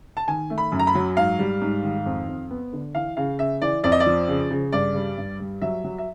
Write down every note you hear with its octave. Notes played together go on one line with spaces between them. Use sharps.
A5
D#3 G#5
A3
B5
F#2
A#5
B5
F#3
G#2 F5
G3
G#2
D#3
F2
F2
B3
D3
E3 F5
C#3 F5
C#3 E5
E3 D5
F2 D5
D#5
D5
F3
C#3
C#3
G2 D5
G3
G2
G3
F#3 E5
F#3
E5